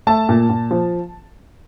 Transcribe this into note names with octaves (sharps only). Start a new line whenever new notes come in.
A3 A5
A#2
A#2
F3